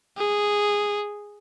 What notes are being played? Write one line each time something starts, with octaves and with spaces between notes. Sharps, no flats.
G#4